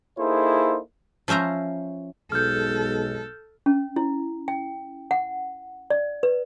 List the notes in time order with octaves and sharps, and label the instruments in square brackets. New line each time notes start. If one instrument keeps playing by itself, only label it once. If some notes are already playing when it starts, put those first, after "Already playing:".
[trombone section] A#3 D#4 E4 G#4 A4 C5
[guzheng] F3 C#4 C5 E5 A#5
[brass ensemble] B1 G#3 [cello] A4 [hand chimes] F6 G6
[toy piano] C#4
E4
G5
F#5
D5
B4